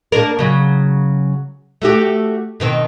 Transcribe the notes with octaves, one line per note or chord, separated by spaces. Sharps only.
A#3 D4 A#4
C#3 F#3
A3 F#4 G4
B2 D#3 C4